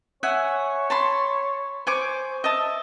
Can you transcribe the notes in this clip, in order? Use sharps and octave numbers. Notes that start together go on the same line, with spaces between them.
C#5 E5 F#5 G#5
A5 B5 C6
C5 G#5 C#6 D6
D#5 E5 A5